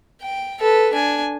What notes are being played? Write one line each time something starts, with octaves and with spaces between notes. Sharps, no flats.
G5
A4 B4
D4 G#5